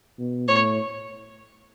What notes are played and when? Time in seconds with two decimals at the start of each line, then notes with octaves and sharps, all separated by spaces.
0.19 B2
0.48 A2 C#5